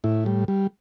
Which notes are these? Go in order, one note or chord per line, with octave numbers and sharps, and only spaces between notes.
A2 E4
G3
G3